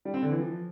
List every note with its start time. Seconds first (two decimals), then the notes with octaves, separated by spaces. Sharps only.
0.05 G3
0.14 C4
0.22 D3
0.31 E3
0.39 F3